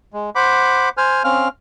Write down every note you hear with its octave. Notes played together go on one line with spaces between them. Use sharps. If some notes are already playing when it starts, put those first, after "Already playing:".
G#3
C5 F#5 B5 D6
C5 G#5 F6
C4 C#4 F5 F6